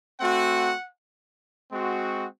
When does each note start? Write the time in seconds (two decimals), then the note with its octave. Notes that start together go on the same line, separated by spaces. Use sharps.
0.19 A3 C4 F#4 F#5
1.73 G#3 C4 F#4